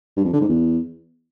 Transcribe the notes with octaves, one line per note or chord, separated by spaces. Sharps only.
G2
F2
D3
G#2
E2